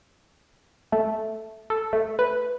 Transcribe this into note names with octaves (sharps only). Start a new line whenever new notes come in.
A3
A4
A3
B4